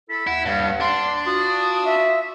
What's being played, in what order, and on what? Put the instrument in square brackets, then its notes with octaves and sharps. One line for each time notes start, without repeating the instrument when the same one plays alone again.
[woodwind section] E4 A4 [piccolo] B6
[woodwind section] D#2 F#5 [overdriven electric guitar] E4
[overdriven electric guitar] G2 [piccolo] F5
[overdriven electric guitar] D4 [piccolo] C6
[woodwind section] F4 F#4 [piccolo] D#6
[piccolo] E5